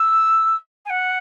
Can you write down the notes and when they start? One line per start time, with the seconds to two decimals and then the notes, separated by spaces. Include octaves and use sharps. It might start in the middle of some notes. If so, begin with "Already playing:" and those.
Already playing: E6
0.85 G#5
0.89 F#5